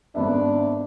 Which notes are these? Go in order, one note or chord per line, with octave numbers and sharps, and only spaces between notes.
G#1 B3 D4 E5